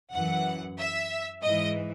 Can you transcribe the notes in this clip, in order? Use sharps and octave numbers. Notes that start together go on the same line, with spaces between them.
F#2 E3 F#5
E5
G#2 E3 D#5